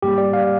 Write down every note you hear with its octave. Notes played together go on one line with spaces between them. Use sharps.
G#2 G3 A#3 G4
D5
F5